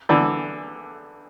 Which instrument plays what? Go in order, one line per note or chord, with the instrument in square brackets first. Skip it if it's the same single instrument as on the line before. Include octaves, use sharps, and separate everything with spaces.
[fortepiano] D3 E3